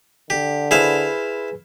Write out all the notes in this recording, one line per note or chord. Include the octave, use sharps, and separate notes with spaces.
D3 G4
E4 G#4 B4 C5 F5